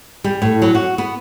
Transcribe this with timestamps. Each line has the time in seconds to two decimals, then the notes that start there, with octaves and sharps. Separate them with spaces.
0.24 G3
0.42 A2
0.62 F#3
0.75 F#4
0.98 B3